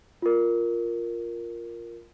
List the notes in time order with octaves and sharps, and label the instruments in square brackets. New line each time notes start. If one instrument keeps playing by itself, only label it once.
[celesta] F4 A#4